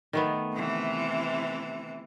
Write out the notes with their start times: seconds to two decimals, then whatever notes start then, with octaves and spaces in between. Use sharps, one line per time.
0.13 D#3 A3 B3
0.53 C3 E3